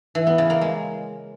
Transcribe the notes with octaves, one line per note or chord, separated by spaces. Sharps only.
E3
B3
C#3
A#3
G#3